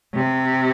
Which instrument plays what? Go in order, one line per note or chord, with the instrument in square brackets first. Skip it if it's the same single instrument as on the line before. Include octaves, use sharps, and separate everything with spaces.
[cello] C3